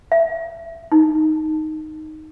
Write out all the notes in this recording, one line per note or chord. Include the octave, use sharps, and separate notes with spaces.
E5
D#4